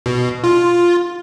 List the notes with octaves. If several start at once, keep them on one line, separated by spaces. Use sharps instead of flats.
B2
F4